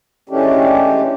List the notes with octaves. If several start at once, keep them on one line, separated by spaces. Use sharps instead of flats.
E3 G#3 A3 C#4 D4 G4